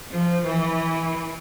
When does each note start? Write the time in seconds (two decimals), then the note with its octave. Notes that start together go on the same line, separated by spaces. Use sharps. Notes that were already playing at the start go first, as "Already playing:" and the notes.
0.11 F3
0.46 E3